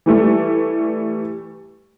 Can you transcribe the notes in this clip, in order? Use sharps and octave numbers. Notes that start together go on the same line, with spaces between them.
E3 G3 A3